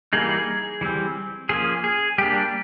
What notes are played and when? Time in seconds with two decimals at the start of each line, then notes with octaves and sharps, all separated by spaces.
0.13 E3 G3 A#3 D#4 G#4
0.81 E3 G3 C4
1.49 F3 A#3 C#4 G#4
1.84 G#4
2.18 G3 A#3 D4 G4